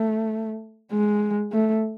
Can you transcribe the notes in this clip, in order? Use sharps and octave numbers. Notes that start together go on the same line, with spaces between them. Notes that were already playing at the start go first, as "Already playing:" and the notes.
Already playing: A3
G#3
A3